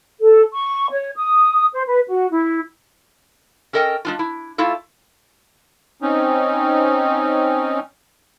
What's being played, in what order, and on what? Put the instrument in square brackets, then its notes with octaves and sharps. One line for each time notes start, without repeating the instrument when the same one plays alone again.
[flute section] A4
C#6
C#5
D#6
C5
B4
F#4
E4
[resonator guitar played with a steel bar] C#4 A4 A#4 D#5 G5
G#3 D4 F4
E4
A3 E4 F4 A4
[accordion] C4 C#4 D#4